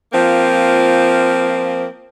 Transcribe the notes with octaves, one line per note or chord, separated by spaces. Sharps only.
F3 A#3 C4 F4